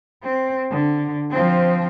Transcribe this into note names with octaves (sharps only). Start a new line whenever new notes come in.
C4
D3
F3 C4